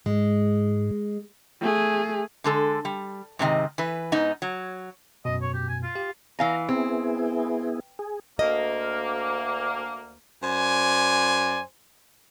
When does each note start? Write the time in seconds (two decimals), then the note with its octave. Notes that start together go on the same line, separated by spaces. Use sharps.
0.06 G#2 G#3
1.61 A3 G#4
2.44 D3 G#3 A4
2.85 G3
3.39 G#2 C3 D#3 D#5
3.78 E3 B4
4.12 G#2 B3 D#4
4.42 F#3
5.25 F#2 B2 D#5
5.42 C#5
5.54 G4
5.69 G#5
5.83 F4
5.96 G4 F5
6.39 E3 F5 G#5 A#5
6.69 B3 C4 E4 G#4
7.99 G#4
8.39 D2 A#3 D#5
10.42 F#2 C5 D5 G#5